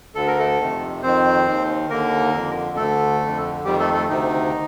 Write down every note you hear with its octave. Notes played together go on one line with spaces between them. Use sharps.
D2 D3 A4
A#4
A3 A4
F2 C3 D#3
F2 D#3 C4 C5
D#2 D#3
D#2 D3 A#3 A#4
F2 D3
D2 D3 A3 A4
F2 D3
F2 D#3 G3 G4
A3 A4
A3 A4
D2 C3 D#3 D#4